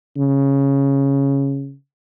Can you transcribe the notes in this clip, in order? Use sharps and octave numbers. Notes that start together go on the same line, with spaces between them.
C#3